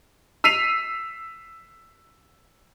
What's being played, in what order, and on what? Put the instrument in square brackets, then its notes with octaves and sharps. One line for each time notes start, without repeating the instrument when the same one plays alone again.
[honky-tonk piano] E6 B6 C7 D#7 F7